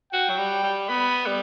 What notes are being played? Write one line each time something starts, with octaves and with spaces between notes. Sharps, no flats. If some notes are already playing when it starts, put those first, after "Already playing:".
F#4 G5
F#3
G3
G3
B3 B5
G3